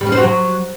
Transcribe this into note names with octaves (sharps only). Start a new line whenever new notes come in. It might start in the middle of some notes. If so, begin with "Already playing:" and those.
G3
C#4
C5
F#4
F#3